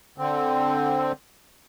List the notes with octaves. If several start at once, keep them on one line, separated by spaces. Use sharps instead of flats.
D3 C4